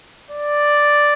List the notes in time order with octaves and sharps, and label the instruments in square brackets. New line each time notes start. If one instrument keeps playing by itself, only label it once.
[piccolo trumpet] D5